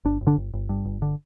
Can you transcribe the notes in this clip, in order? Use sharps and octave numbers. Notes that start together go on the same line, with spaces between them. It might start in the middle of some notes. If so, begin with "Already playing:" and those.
G1 D4
G1
D3 D4
G1
G1
G2
G1
D3